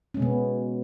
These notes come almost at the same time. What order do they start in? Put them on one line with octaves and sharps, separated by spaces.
C#4 G#3 B2 B3